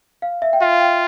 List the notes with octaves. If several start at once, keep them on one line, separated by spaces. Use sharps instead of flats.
F5
E5
G5
F4 F5
G5